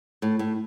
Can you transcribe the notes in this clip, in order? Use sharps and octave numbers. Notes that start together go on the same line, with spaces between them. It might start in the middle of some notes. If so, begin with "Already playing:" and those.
A2
A2